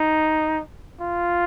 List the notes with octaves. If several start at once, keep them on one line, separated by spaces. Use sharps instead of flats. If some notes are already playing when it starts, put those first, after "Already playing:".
Already playing: D#4
F4